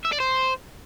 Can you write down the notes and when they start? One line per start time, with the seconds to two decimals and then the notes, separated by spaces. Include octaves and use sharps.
0.05 E5
0.12 D5
0.20 C5